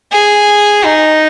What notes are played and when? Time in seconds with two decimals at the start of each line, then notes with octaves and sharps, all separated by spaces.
0.12 G#4
0.85 D#4